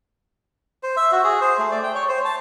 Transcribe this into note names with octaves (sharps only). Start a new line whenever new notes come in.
C5
E5
F#4
G#4
C5
A3
D5
G5
C#5
C5
A5